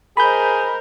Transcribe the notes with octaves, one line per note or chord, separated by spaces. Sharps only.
G#4 A#4 C5 D#5 B5 G6